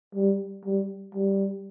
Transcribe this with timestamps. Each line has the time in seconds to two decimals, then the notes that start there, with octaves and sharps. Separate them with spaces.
0.15 G3
0.65 G3
1.15 G3